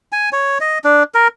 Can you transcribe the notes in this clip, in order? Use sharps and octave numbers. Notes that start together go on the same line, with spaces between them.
G#5
C#5
D#5
D4
A#4